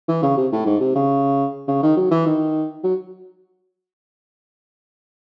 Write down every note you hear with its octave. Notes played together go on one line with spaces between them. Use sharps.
E3
C#3
C3
A2
G#2
C3
C#3
C#3
D#3
F#3
E3
D#3
F#3